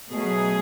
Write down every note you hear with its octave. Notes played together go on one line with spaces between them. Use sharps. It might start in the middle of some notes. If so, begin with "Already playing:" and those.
B2 F#3 A3 G#4